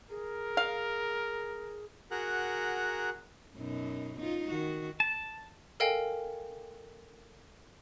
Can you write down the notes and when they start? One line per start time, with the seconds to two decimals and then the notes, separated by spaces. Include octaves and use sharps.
0.10 G#4 A#4
0.57 F5
2.11 F#4 G#4 A#4 F#5 A#5 F#6
3.55 F#2 B2 D#4
4.20 D#4 F4
4.50 D#3 F#4
5.00 A5
5.80 A4 A#4 D#5 F5 G5 G#5